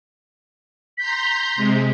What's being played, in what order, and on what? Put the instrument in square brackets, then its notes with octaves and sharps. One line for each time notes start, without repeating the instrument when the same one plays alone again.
[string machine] A#5 C6 G6 [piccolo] B6
[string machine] C3 G#3